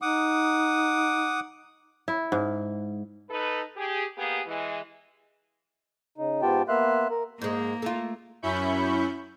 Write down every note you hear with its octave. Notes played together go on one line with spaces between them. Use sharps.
D#4 F#5 D6 D#6
E4
G#2
D#4 A4 B4
G4 G#4
A#3 B3 G4 G#4
E3 G#3
C#3 D#4
G#2 B3 F4 G4 G5 A5
A#3 B3 E5 F5 C6 F#6
A#4
G#2 G#3 A#3
A3 F4
F#2 C#4 E4 B5 C#6 G6